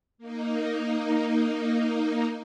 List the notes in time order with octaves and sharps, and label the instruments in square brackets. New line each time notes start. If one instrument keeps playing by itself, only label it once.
[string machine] A#3 D#4